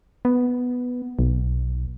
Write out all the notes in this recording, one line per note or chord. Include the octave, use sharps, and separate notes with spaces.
B3
B1